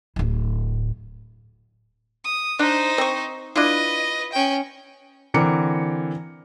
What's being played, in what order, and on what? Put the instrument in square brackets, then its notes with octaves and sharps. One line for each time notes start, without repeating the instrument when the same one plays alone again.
[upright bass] D1 A2
[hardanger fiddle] D#6
[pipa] D4 [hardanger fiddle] D#4 C5
[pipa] C4 C#6
[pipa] D4 E4 F4 [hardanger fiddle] B4 D#5
[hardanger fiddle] C#4 G5
[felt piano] D3 E3 C4 A#4 D6 C#7